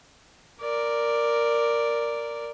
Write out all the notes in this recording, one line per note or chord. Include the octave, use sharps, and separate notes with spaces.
A#4 D5